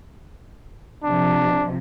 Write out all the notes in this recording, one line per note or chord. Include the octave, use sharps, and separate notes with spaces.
C3 F3 D4